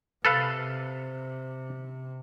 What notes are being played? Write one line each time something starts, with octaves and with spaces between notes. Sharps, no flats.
C3 A4 B4 F5